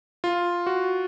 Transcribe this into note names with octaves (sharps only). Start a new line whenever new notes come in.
F4
F#4